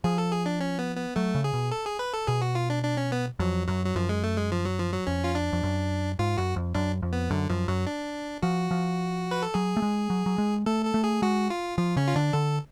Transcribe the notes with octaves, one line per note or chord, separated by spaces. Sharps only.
F3 G#4
A4
G#4
D4
C#4
B3
B3
F#3 A3
C#3
G#4
B2
A4
G#4
B4
A4
B2 G#4
F#4
F4
D4
D4
C#4
B3
F2 F#3
F#2 F#3
F#3
F#2 F3
G#3
A3
G#3
F3
F#3
F3
F#3
F2 C#4
F4
D4
F2
F#2
G#2 F4
F#2 F#4
F2
F#2 D4
F2
B3
F#2 D3
F#2 F3
F#2 F#3
D4
F3 F#4
F3
B4
A4
F#3 G#4
A3
G#3
F#3
F#3
G#3
A3 A4
A4
A3
G#4
G#3 F#4
F4
F3 F4
C#3 C#4
F4
D3 D4
D3 A4